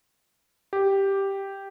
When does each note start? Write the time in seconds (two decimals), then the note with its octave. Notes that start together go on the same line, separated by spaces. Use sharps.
0.73 G4